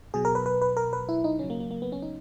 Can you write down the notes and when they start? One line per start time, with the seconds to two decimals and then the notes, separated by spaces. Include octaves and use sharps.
0.14 B2 F#3 G#4
0.25 A#4
0.35 B4
0.46 B4
0.62 B4
0.77 A#4
0.93 B4
1.09 E4
1.24 D#4
1.39 C#3 F#3 C#4
1.50 A#3
1.60 A#3
1.71 A#3
1.82 B3
1.92 C#4
2.02 D#4